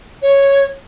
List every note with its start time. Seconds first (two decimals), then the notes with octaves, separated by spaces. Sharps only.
0.22 C#5